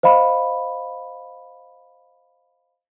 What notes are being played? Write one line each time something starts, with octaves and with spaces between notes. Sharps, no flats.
C5 D#5 F5 B5